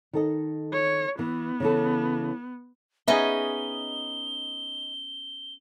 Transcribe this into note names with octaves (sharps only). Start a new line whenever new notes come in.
D#3 A4 D#5
C#5
E3 B3
C#3 E3 A4
B3 C#4 D#4 G#4 D#5 E5 B5 G7